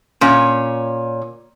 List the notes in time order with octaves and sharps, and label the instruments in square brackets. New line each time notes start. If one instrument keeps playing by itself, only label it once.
[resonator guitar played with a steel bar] A#2 C#4